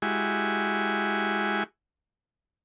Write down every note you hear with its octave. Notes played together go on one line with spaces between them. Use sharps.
G#3 E4 F#4 G4 G#5